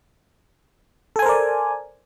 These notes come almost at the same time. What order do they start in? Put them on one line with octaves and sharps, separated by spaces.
A4 G#5 C5 A#4 D5